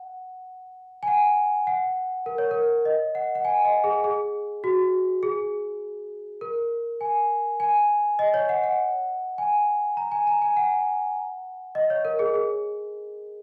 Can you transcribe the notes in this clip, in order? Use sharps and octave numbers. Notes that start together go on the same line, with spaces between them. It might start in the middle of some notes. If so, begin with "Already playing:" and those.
Already playing: F#5
G#5
F#5
F#5
A#4
C#5
A#4
D#5
F#5
F#5
G#5
D#5
G#4
G#4
F#4
G#4
A#4
G#5
G#5
D#5
C#5
F#5
F#5
G#5
A#5
G#5
A#5
G#5
F#5
D#5
C#5
A#4
G#4
G#4